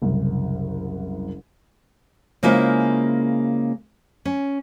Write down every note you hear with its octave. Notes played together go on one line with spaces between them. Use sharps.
F#1 C2
C#3 G#3 A#3 E4 F4 C5
C#4